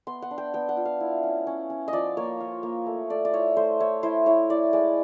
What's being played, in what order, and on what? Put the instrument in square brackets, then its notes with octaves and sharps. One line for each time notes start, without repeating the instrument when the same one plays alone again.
[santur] B3 C6
F#5
D4
G5
B3 G5
F#5
F4
F5
E4
C#4
C#4
C#4
D#5
F3 D5
A#3 C#5
F4
A#3
A3
A3 D5
D5
E4 C#5
A3 C5
E4 C#5
E4 C5
E4 C#5
E4 D5
G#3 D5